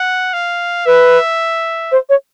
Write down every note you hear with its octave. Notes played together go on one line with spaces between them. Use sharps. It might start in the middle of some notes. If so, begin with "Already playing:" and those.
Already playing: F#5
F5
B4 E5
C5
C#5